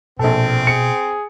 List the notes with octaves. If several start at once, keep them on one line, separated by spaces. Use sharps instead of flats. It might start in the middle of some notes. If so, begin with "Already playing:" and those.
A#1 B2 C4 A4
G#4 C#7